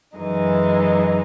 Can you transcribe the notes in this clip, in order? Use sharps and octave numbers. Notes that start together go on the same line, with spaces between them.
F#2 E3 G#3 D#4